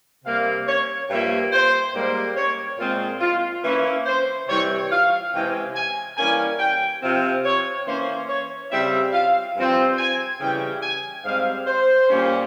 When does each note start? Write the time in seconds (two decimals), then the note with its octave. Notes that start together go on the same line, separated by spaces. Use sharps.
0.24 C3 G3 A#3 F5
0.67 C#5
1.10 G2 F3 A#3 E5
1.52 C5
1.94 G#2 G3 A#3
2.36 C#5
2.79 A#2 G#3 C4 F4
3.21 F4
3.63 E3 A#3 C#4 E4
4.06 C5
4.47 C3 E3 G3 C#5
4.90 F5
5.32 C3 E3 G#3 C#4 G5
5.75 G#5
6.17 E3 G3 A#3 C#4 G#5
6.59 G5
7.01 C3 F3 C4 F5
7.44 C#5
7.85 E3 A#3 C#4 C5
8.28 C#5
8.70 C#3 G3 C4 E5
9.13 F5
9.56 G2 F3 C4
9.98 G#5
10.40 C#3 E3 G3 C#4 G5
10.82 G#5
11.24 G#2 G3 C4 F5
11.66 C5
12.09 A#2 G3 A#3 C#4